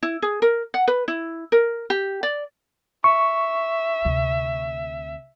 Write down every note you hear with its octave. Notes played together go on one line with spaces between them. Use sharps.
E4
G#4
A#4
F#5
B4
E4
A#4
G4
D5
E5 C#6
D2 C3